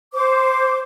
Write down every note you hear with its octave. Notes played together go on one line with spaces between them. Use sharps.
C5 D6